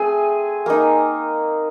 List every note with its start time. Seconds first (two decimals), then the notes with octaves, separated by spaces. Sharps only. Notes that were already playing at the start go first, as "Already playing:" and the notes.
Already playing: A3 C4 G#4 G#5
0.66 A#3 D#4